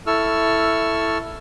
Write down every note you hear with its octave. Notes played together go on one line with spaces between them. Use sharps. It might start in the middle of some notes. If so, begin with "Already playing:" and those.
E4 A4 C#6 E6 F6